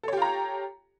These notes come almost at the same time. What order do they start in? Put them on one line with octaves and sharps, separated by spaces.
A4 C#5 G4 F4 A#5